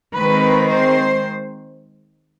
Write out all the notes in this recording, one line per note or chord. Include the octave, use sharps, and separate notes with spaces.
D#3 G#3 C4 B4
C5